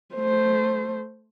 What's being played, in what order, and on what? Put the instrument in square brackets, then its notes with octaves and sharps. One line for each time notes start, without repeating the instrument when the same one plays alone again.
[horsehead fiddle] A3 C5